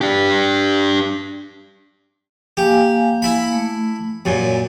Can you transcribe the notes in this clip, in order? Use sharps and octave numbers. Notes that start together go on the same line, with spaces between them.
D4 G4
A#3 G4 F5 G#5
E4 B5
A3
F#2 A#2 C#5